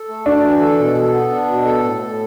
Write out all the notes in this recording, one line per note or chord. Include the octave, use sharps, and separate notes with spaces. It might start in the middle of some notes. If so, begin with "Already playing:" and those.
Already playing: A4
A3
D4 F#4
E3
A4
B2
A4
B3
D4
B2
A4
A2
A4